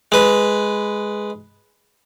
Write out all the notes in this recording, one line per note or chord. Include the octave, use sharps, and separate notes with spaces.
G#3 B4